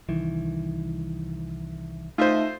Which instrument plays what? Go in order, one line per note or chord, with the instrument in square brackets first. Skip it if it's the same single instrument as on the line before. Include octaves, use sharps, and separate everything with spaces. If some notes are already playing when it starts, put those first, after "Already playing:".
[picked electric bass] C2 D#3 E3
[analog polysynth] A3 D#5 E5 [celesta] D#4 [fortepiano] F4 C5